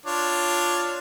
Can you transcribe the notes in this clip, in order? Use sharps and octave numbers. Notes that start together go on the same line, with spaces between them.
D4 F4 C#5